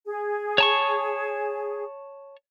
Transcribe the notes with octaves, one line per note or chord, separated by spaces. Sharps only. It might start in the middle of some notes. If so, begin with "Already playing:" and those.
G#4
C#5 A5 C#6